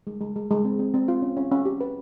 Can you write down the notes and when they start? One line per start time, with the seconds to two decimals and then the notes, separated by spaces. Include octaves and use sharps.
0.07 G#3
0.21 G#3
0.36 G#3
0.51 G#3
0.65 C4
0.79 C4
0.94 C4
1.08 F4
1.22 C#4
1.37 C#4
1.52 C#4
1.65 G4
1.81 B4